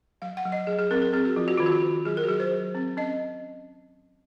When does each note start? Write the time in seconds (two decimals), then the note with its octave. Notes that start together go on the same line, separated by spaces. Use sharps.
0.22 F#3 F5
0.37 F#5
0.45 F#3
0.52 D#5
0.67 F#3 G#4
0.79 G#4
0.91 C4 A#4
1.02 A#4
1.13 C4 G#4
1.25 F#4
1.36 F3 F4
1.48 F#4
1.57 D#3 F4
1.66 F#4
1.83 D#3
2.05 F#3 G#4
2.17 A#4
2.24 F#4
2.28 F#3 G#4
2.40 C5
2.51 F#3
2.75 C4
2.97 C#4 D#5